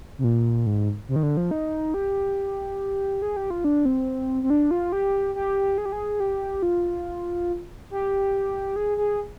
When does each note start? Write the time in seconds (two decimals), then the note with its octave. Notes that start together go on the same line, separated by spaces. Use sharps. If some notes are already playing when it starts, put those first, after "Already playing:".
0.18 C3
0.24 A#2
0.66 G#2
1.08 C3
1.16 D#3
1.23 D3
1.37 F3
1.51 D#4
1.94 G4
3.22 G#4
3.36 G4
3.50 F4
3.64 D4
3.85 C4
4.43 C4
4.50 D4
4.71 F4
4.92 G4
5.35 G4
5.78 G#4
5.85 G4
5.92 G#4
6.20 G4
6.62 F4
7.91 G4
8.76 G#4
8.98 G#4